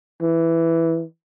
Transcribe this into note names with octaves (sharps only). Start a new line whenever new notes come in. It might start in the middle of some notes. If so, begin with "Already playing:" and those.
E3